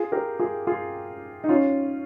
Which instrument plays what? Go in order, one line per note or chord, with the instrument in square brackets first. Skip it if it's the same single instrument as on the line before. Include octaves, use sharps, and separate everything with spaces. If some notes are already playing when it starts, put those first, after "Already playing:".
Already playing: [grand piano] F4 G#4
G4 A#4
F4 G#4
F4 G#4
D#4
C#4 F4